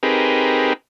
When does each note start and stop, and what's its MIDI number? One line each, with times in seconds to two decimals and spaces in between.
0.03 0.73 60
0.03 0.73 63
0.03 0.73 67
0.03 0.73 68
0.03 0.73 70
0.03 0.73 71